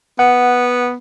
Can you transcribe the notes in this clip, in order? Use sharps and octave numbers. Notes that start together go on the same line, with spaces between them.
B3 F#5